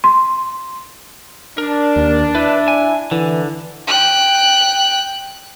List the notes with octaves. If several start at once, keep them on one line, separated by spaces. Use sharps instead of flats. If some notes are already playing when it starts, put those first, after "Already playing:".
C6
D4 A#4
D#2
E4 B4
G#5
D3 E3
G5 F#6